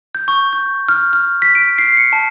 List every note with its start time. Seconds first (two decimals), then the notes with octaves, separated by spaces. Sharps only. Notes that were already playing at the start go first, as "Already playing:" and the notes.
0.15 G6
0.28 C#6
0.53 G6
0.89 F6
1.13 F6
1.42 B6
1.55 D7
1.78 C7
1.97 C#7
2.13 A5